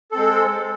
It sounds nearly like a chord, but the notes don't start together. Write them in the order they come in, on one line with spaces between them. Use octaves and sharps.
A4 C4 G#3